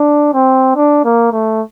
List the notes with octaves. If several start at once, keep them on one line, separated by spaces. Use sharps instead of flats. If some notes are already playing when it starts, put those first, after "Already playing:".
Already playing: D4
C4
D4
A#3
A3